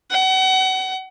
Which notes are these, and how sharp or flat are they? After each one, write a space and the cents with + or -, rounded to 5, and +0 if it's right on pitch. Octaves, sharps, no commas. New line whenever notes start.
F#5 +35